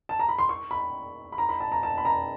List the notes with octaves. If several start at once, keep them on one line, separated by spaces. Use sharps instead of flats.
A5
A#5
B5
C6
C#6
B5
B5
A#5
B5
A5
A#5
A5
B5
A#5